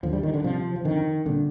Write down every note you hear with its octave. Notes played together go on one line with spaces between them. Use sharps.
D#2 D3 F3
G3
D#3
D3
C2 C3 F3
F3
F2 D3 D#3
C2 A#2 D3